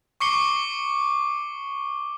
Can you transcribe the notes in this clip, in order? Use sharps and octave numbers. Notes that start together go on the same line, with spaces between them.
C#6 D6 C7 C#7 G7